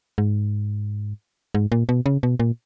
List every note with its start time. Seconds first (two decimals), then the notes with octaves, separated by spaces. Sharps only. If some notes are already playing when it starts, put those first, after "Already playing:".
0.18 G#2
1.54 G#2
1.72 A#2
1.89 B2
2.06 C#3
2.23 B2
2.40 A#2